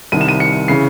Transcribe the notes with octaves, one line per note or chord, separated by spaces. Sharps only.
C2 C3 D#3 D#7
E7
D#7
C#7
C#3 E3 C7